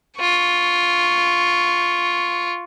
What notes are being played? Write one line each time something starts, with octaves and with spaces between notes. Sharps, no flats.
F4 C#6